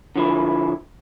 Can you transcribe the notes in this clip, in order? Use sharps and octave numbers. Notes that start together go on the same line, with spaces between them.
D3 F3 E4